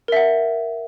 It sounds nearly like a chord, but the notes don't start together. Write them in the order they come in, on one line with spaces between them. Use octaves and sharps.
A#4 E5 F#5